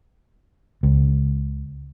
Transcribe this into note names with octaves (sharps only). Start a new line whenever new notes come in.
C#2